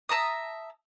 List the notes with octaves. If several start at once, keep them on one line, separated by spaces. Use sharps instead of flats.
E5 A5 A#5 D#6